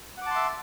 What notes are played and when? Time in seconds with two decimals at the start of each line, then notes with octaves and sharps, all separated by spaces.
0.17 F#5
0.22 D6
0.26 A5
0.31 C6
0.35 E5